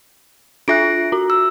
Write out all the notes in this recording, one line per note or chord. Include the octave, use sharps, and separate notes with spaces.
D4 F4 E5 F#6 A#6 D7
F#4 A#5
E6